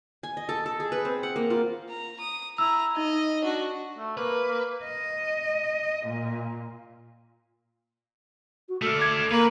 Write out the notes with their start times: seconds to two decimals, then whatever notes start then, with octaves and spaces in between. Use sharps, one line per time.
0.23 G#5
0.37 D#5
0.49 A4
0.66 A4
0.80 G#4
0.92 B4
1.05 C4
1.23 F#5
1.36 A#3
1.50 F4
1.90 A#5
2.20 D#6
2.58 E4 A#5 E6
2.97 D#4 D#5
3.42 D4 F#4
3.98 A3
4.17 A#3 B4
4.48 A#3
4.84 D#5
6.06 A#2
8.69 F#4
8.82 A3 D4 A4 E6 F6
8.99 D6 G#6
9.32 A#3 A#4 B4